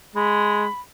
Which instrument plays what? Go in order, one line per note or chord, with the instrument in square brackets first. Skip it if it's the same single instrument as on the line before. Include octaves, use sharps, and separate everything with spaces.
[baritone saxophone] G#3 [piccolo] B5